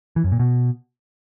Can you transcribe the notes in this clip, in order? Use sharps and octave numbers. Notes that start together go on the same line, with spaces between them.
E3
F#2
A#2
B2